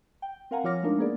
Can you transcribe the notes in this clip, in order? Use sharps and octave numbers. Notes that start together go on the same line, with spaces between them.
G5
C4 A#4 F5 F#5 G#5 A#5
F3 F4 C#5 D6 F6 A#6
G#3 A3 D4 D#4 F4 A#4
A#3 B3 G#4 A#4 D5